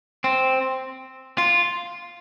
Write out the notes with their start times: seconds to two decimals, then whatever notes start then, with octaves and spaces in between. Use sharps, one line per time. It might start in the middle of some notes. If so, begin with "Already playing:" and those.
0.24 C4
1.38 F4